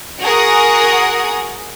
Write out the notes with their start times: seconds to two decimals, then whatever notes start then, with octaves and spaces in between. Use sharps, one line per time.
0.22 F#4 G#4 A#4 F#5 D#6